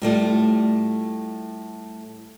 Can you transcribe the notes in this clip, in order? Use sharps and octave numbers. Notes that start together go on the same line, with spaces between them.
A2 G3 A3 F4